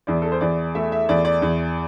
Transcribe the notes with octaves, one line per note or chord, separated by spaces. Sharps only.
E2 D5
A4
C5
E2 D5
A3 E5
E5
E2 D5
D5
E2